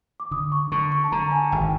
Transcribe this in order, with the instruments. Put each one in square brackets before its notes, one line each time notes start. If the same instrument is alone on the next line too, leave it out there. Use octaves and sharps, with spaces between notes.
[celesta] D6
[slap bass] D3 [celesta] D#6
[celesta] C#6
[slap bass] D3 [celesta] C#6
[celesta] C#6
A5
[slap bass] D3 [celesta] A#5
[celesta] G#5
[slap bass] G#1 [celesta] G5